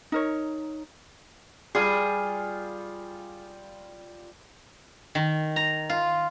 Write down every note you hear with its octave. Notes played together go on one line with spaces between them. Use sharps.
D#4 A#4 C#5
G3 F4 G#4
D#3
A#5
F4